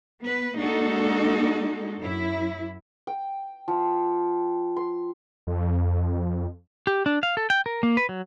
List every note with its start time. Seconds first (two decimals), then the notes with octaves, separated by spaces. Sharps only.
0.22 B3 B4
0.56 G#3 A#3 D4 D#4 F#4 A4
1.99 F#2 E4
3.07 G5
3.68 F3
4.76 C6
5.47 F2
6.87 G4
7.06 D4
7.23 F5
7.37 A4
7.50 G5
7.66 A#4
7.83 A#3
7.97 B4
8.09 F#3